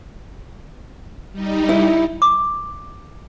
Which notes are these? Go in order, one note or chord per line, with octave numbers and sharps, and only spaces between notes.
G3 D#4
E4
D6